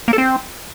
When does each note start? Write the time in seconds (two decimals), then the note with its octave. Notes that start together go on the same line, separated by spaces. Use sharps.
0.08 A#3
0.13 A4
0.18 C4